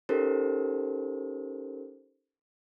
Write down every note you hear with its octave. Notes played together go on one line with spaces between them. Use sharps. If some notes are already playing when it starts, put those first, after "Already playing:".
C#4 D#4 G4 A4 A#4 C5